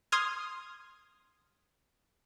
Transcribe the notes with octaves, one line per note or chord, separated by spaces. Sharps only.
C6 D#6 F6 G#6